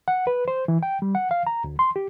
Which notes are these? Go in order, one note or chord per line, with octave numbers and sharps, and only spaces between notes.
F#5
B4
C5
E3
G5
G3
F#5
F5
A#5
D2
C6
G4